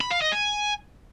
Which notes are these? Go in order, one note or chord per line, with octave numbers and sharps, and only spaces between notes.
B5
F5
D#5
G#5